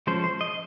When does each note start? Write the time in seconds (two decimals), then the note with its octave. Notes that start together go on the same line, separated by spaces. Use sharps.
0.07 F3 G#3 C#4 C5
0.24 C5
0.41 D#5